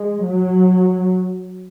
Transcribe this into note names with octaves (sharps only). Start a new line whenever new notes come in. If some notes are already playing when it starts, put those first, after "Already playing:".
Already playing: G#3
F#3